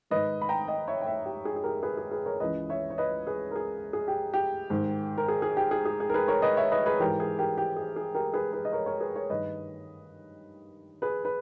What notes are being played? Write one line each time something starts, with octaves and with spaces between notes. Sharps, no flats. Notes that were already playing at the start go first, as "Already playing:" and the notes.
G#2 D#3 B4 D#5
B5
G5 A#5
D#5 G5
C#5 E5
G5
C#5 E5
G4
G#4
G#4
G4 A#4
G#4 B4
G#4
G#4 B4
A#4 C#5
C#2 C#3 E3 B4 D#5
C#5 E5
C#5
B4 D#5
G#4 B4
A#4
G#4
G#4
G4
G4
G#2 D#3
A#4
G#4
G#4
G4
G#4
G#4
G#4
A#4
G#4 B4
A#4 C#5
B4 D#5
C#5 E5
B4 D#5
G#4 B4
G#2 E3 G4 A#4
G#4
G4 A#4
G4
G#4
G#4
G4 A#4
G#4 B4
G#4 B4
D#5
A#4 C#5
A#4 C#5
G#4 B4
A#4 C#5
G2 D#3 B4 D#5
G#4 B4
B4